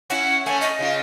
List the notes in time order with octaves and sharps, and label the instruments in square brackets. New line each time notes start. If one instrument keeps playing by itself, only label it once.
[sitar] C#4 E4 [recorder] F#5
[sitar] A3 C#4 [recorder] G#5
[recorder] D#5
[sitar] C#3 E4 F4